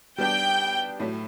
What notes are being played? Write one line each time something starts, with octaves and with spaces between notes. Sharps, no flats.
G3 B3 D4 G4 G5
A2 F#3 A3